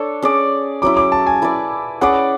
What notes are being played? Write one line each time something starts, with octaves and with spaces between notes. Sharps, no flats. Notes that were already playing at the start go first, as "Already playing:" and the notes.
Already playing: D4 A4 C#5
C#4 G#4 D5
F#3 C#4 E4 D6
D6
A5
G#5
E4 B4 D5
C#4 G#4 B4 D5 F#5